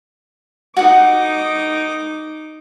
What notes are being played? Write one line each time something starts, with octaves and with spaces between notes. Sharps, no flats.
D#4 F#4 F#5 D6